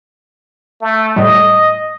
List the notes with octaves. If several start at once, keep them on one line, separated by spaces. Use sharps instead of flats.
A3
A2 G3 D#5